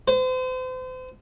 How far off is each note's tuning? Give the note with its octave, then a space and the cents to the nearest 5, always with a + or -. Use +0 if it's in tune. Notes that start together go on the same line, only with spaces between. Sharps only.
C5 -40